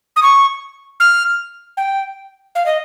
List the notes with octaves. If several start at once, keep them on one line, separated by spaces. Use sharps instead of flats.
D#6
C#6
F6
G5
F5
D#5